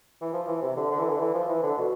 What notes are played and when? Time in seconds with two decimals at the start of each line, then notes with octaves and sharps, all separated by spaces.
0.21 E3
0.33 F3
0.48 E3
0.62 C3
0.76 D3
0.91 D3
1.00 E3
1.10 D3
1.20 E3
1.34 F3
1.49 E3
1.63 D3
1.78 B2